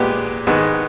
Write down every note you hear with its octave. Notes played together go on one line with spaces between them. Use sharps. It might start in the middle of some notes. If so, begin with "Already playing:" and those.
Already playing: A#2 G#3 B3 G4
G#2 D#3 G#3 B3